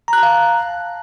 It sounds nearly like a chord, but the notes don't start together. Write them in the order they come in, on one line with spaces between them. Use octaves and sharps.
A#5 F#6 A5 F5